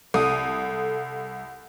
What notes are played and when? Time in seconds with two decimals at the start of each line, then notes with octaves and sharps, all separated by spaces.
0.14 C2 A4 D#6